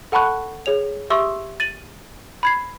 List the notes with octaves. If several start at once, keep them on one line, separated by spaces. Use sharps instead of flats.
A4 F#5 A5 B5 C#6 F#6
G#4 C#5 F7
G4 E5 C6 C#6 D#6 E6
A6 D#7 F#7
B5 G#6 C7